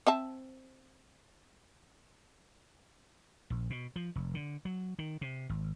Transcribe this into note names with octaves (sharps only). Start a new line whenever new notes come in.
C4 E5 A5
A#1
B2
F3
F1
D3
F#3
D#3
C3
G#1